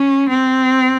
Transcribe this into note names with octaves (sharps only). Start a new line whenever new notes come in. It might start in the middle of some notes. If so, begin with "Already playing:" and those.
Already playing: C#4
C4